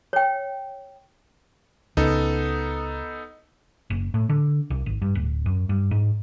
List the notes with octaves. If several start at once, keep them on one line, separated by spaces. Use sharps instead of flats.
C#5 G5
C#2 B3 D#4 A4
F#1
A2
D3
C2
G#1
G2
D1
F#2
G2
G#2